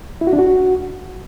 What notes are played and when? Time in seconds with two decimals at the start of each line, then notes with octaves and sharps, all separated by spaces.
0.21 E4
0.27 F#4
0.33 D4
0.39 F#4